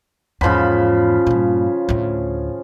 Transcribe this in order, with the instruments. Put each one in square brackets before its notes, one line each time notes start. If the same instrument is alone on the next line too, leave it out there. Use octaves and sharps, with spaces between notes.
[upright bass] E2 G#2 [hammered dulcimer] C#3 F3 B5
[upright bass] G2 A#2
D2 A2